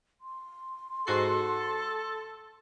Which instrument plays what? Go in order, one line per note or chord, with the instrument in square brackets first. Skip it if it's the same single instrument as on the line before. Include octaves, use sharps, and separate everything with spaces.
[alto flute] C6
[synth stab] G#2 F#4 C7 [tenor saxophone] A4